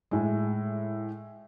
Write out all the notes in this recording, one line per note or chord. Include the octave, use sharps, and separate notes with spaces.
A2 G#3